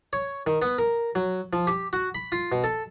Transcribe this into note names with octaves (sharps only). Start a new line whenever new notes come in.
C#5
D#3
B3
A#4
F#3
F3
G4
F#4
B5
F4
B2
A4